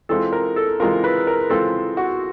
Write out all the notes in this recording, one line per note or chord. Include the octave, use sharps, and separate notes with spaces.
E3 G#3 C4 F4 A4
A#4
A4
E3 G#3 C4 F4 A#4
B4
A#4
E3 G#3 C4 F4 A4
F#4